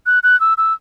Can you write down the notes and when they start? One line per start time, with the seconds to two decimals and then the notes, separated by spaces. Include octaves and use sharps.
0.06 F#6
0.23 F#6
0.40 E6
0.58 E6